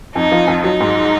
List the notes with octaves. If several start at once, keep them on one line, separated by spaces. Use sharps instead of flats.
F2 D#4
F3
F2
F#3 D#4
G#2